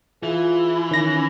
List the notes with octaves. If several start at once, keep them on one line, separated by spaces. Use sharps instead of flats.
E3 F4 G#4
D#3 C#4 A#6